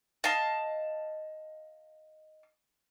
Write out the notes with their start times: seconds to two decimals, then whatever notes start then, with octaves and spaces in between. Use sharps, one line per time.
0.24 D#5 F5 A5